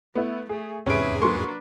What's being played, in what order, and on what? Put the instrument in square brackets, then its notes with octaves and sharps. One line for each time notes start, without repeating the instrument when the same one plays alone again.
[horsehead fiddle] A3 [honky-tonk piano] B3 E4
[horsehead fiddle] A3 [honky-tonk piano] G#4
[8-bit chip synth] E2 G#2 G#4 [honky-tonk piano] C3 [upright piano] C#4 D7 [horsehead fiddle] B4 E5
[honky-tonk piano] F#3 A#3 [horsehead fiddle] D4 B4 [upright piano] C6 C#6